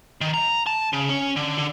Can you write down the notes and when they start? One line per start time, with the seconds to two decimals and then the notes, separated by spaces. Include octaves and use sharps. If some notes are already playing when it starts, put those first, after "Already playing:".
0.21 D#3
0.34 A#5
0.67 A5
0.93 C#3
1.09 C#4
1.36 D3
1.58 D3